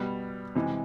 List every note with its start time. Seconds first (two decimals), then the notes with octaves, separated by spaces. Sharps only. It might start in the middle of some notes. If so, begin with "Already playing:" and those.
Already playing: B2 G3 B3
0.55 C3 E3 G#3